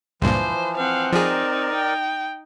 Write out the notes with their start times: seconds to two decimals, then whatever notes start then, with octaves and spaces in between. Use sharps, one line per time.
0.22 C#2 G2 A#2 E3 F3 C5
0.77 C4 F5 F#5
1.13 F3 D#4 G#4 A#4 D5
1.75 G5